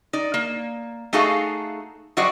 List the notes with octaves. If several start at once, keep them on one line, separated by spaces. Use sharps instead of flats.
D#4 D5
A#3
A3 D#4 F#4 G#4 A4 F5
F#3 G3 F#4 C5 D5 D#5